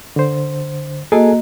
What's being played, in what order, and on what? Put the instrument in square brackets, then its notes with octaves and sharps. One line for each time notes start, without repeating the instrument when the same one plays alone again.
[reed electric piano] D3 C5
[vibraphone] A#3 F#4 D#5 [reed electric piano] G#4 A4 G#5